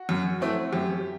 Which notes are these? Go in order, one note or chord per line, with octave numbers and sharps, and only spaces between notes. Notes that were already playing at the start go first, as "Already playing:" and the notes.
Already playing: F#4
F#2
E3 A3 C4
F#2 G4